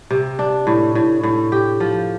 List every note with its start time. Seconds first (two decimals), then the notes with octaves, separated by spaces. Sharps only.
0.11 C3
0.39 D4
0.67 A2
0.95 A2
1.23 A2
1.52 G4
1.80 F3